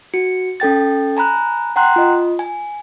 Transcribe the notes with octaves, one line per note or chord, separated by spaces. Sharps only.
F#4 C#7
C#4 A4 G5 A6
G#5 A#5 B5 F#6
F#5 G5 A#5 C6 F#6
F4 D#5
G#5